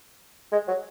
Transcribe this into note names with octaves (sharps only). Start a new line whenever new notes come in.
G#3
F#3